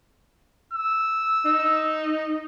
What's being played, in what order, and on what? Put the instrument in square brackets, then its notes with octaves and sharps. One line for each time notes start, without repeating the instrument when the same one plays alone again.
[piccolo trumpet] E6
[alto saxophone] D#4